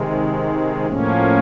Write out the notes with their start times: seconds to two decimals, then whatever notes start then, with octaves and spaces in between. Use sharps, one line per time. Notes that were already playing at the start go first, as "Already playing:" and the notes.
Already playing: C3 D#3 G#3
0.87 A2 F3 A#3 C#4